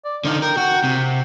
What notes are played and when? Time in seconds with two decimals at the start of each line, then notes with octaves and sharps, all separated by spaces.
0.05 D5
0.25 D3 F3 D#4
0.42 A#4 G5
0.57 F#4
0.84 C3